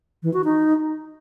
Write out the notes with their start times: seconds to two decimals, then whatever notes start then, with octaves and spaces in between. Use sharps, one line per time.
0.23 E3
0.34 F#4
0.44 D#4